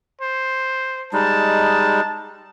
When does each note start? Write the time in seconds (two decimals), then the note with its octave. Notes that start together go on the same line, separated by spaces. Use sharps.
0.21 C5
1.13 G3 G#3 D#4 A5